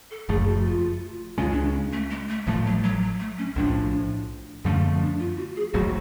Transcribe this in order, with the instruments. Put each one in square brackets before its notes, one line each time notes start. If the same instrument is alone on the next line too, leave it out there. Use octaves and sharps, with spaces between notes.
[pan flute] A4
[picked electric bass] F#1 F#2 F3 A3 [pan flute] G#4
[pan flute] F#4
F4
[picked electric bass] C#2 C#3 G#3 C#4 [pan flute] F4
[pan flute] D4
A3
G#3
A3
[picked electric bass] A1 A2 F3 A3 [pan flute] G#3
[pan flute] F#3
F#3
F#3
A3
C#4
[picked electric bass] B1 A2 F3 [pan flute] D4
[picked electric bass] F#2 D3 F3 A3 [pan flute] C#4
[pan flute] B3
D4
F4
F#4
G#4
[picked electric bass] G#1 G#2 F#3 A3 [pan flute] F#4